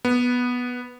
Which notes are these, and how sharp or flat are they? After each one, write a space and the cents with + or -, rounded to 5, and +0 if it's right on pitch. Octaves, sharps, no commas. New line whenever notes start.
B3 -5